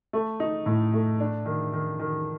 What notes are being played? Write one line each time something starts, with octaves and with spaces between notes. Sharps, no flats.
A3
D#4
A2
A3
D4
D#3
D#3
D#3